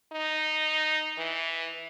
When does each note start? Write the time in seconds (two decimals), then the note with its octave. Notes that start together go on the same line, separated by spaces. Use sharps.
0.12 D#4
1.18 E3